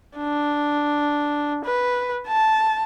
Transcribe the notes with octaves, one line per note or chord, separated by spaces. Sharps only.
D4
B4
A5